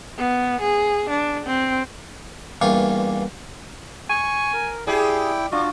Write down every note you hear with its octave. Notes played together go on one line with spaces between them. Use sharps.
B3
G#4
D4
C4
E2 G2 A#3 F4 C#6
G#5 C#6
A#4
E4 G4 G#4 D5 G5
D4 F4 F#4